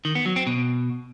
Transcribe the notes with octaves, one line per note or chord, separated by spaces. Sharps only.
D#3
B3
F#3
C4
B2